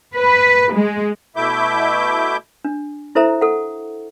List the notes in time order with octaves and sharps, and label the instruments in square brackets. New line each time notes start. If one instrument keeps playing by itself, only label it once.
[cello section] B4
G#3
[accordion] B2 A3 E4 E5 D6 G6
[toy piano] D4
E4 A4 C5 E5 A#5
A4 F#5